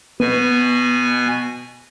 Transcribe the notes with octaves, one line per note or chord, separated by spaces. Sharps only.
B2 B3 G#5